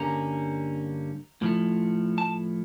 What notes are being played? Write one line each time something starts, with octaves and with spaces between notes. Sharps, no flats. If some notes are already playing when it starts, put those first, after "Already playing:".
Already playing: G2 D3 G3 A#3 C#4 A#5
A2 F3 A3
A5